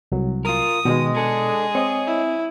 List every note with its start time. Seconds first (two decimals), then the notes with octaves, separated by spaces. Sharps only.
0.12 C2 F#3
0.45 F4 A#4 D#6
0.85 B2 D#3 G#3
1.17 D4 G#4 A4
1.75 C4 C#5 D#5
2.07 E4